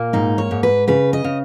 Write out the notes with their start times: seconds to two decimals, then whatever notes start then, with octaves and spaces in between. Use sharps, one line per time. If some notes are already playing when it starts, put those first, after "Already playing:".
Already playing: A#2 A#3
0.13 G#2 D#4
0.38 C#5
0.51 G#2
0.63 B4
0.88 C#3 B4
1.13 D#5
1.24 C#3